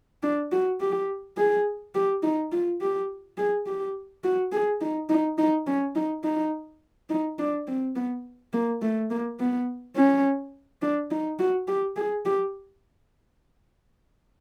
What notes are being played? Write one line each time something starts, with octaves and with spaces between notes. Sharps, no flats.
D4
F#4
G4
G#4
G4
D#4
F4
G4
G#4
G4
F#4
G#4
D#4
D#4
D#4
C#4
D#4
D#4
D#4
D4
C4
B3
A#3
A3
A#3
B3
C#4
D4
D#4
F#4
G4
G#4
G4